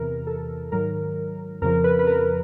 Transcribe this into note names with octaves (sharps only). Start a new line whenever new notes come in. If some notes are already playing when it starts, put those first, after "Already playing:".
Already playing: E2 C3 E3 A#4
A4
G#2 D#3 F#3 A#4
F2 C#3 F3 A#4
B4
B4
A#4